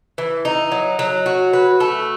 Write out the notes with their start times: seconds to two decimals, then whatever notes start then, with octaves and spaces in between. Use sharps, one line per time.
0.18 E3
0.45 D#4
0.72 F#3
0.99 F#3
1.26 F#4
1.53 B4
1.80 A3